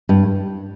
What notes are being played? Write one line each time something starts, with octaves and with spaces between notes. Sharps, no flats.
G2